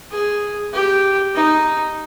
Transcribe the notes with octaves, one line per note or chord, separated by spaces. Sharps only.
G#4
G4
D#4